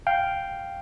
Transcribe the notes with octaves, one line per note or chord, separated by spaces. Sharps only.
F5 G5